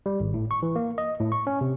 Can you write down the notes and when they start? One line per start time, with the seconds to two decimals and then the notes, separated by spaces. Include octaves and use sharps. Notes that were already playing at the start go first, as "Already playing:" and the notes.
0.06 G3
0.20 G#1
0.34 A2
0.51 C#6
0.63 E3
0.76 A#3
0.98 D#5
1.20 A2
1.32 C#6
1.47 C#4
1.61 C3